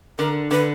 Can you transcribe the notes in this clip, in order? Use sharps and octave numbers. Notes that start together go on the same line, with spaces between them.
D3 A#4
D3 B4